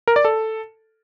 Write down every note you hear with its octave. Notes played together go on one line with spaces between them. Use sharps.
A#4
D5
A4